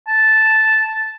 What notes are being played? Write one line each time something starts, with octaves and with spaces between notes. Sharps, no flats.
A5